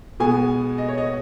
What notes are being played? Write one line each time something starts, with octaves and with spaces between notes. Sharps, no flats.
B2 G#3 B3 G#5
D#5
C#5
D#5